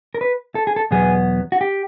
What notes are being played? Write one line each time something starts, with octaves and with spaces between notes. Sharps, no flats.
A#4
B4
A4
G#4
A4
E2 B2 F#3 B3 G#4
F#4
G4